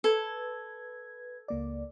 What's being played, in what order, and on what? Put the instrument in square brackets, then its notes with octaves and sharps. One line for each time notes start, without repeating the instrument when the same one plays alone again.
[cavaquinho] A4 [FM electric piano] B4 G#6
[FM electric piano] C#2 A#3 D5